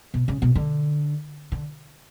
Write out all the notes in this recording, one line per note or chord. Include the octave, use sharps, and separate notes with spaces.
B2
C#3
B2
D3
D3